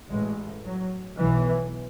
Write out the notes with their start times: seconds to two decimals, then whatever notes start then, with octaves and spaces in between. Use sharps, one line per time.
0.10 A1 A2 G#3
0.64 F#3
1.17 B1 B2 E3